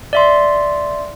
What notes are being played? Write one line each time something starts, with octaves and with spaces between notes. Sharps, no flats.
D5 E5 C6